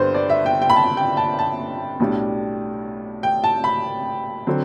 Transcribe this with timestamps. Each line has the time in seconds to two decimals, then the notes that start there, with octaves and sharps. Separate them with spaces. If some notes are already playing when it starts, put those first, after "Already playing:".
Already playing: G1 G2 D3 G3 B3 B4 C5
0.14 D5
0.30 E5
0.46 G5
0.62 G5
0.70 B5
0.76 A5
0.97 G5
1.17 A5
1.39 A5
2.00 B1 A2 G3 D4
3.23 G5
3.44 A5
3.64 B5
4.47 D3 F#3 C4